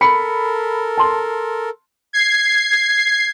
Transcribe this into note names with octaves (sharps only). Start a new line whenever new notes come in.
A4 A#4 B5 C#7
A5 C6
G#6 C7